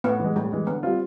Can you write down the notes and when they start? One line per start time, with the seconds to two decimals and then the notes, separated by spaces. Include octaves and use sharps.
0.04 A2 B3
0.19 E3
0.24 G#3
0.35 A2 G3
0.52 E3 G#3
0.67 D3 B3
0.83 G3 C4 F4